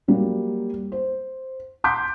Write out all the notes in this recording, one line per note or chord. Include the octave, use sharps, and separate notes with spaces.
F#3 G3 A#3
C5
A#5 C6 D6 G6 B6